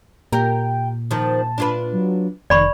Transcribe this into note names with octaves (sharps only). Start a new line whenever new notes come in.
A#2 G4 A#4 G5
D#3 F3 A5
D4 F4 B4
F#3
F1 D#3 D5 B5 C#6